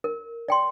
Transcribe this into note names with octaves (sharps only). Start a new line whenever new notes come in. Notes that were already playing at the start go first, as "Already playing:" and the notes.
A#4
D5 G5 C6